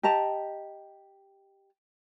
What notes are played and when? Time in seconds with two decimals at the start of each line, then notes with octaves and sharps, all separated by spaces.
0.03 G4 D#5 A5 A#5